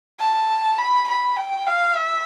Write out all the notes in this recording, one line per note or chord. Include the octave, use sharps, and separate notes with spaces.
A5
B5
B5
G5
F5
E5